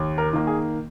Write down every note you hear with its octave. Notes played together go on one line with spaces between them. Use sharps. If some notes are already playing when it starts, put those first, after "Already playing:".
Already playing: D#2
A#4
D#3 A#3
G#4